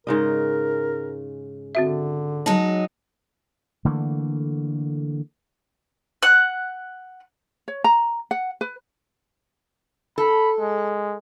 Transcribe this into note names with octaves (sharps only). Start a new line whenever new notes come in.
G#2 C#3 A#4 D#5
D3 C4 F#4 E5
F#3 G#3 D#4 A5
D3 E3 A3 A#3
F#5 F#6
C#5
A#5
F#5
B4
A4 B5
G#3